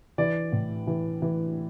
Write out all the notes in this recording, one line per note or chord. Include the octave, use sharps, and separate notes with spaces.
E3 D5
A2
E3
E3